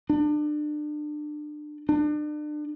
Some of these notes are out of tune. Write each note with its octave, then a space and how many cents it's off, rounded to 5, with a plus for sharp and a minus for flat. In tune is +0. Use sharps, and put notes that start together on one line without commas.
D4 +30
D4 +35